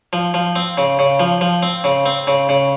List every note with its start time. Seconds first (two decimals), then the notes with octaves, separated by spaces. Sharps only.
0.13 F3
0.34 F3
0.56 C4
0.78 C#3
0.99 C#3
1.20 F3
1.41 F3
1.63 C4
1.84 C#3
2.06 C4
2.27 C#3
2.49 C#3